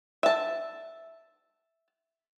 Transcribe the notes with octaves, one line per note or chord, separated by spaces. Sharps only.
E5 A5